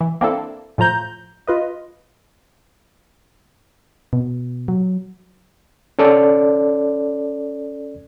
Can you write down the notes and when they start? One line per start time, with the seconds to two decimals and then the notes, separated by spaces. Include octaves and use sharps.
0.01 E3
0.21 A#3 C4 D4 E4 A4
0.78 A2 F3 F4 A#5 G6
1.47 F4 B4 D#5
4.13 B2
4.68 F#3
5.99 C#4 A4 D5